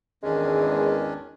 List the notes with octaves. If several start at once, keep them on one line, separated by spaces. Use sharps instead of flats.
G#1 E2 D#3 G#3 C#4 D4